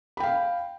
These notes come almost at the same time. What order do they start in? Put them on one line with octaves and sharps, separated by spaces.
B5 G5 F5